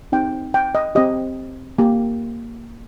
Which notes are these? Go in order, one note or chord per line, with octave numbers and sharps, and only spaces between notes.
C4 D#4 G4 G5
G5
D#5
C4 G4 D#5
A#3 G4